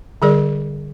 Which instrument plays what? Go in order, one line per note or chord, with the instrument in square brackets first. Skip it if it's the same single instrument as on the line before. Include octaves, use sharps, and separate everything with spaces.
[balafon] D3 G3 G#4 A#4 D5